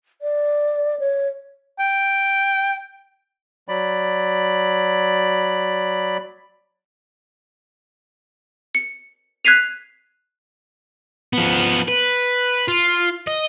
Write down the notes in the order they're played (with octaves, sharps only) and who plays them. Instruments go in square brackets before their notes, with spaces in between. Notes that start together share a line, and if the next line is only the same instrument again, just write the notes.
[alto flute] D5
C#5
[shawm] G5
[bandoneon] F#3 D5 B5
[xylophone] C#7
F#6 G#6 B6 C7 D#7 F7
[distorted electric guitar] F3 B3
B4
F4
D#5